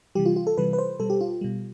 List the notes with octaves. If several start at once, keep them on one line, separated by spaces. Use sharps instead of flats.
C3 E3 G3 G4
F4
F4
A4
C3 E3 G3 B4
B4
C5
B2 G3 A4
G4
F4
B2 G3